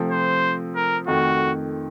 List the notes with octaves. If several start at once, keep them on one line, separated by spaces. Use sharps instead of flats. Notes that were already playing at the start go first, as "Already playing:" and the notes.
Already playing: C3 F3 A3 C4
C5
A#4
F2 D#3 A3 F#4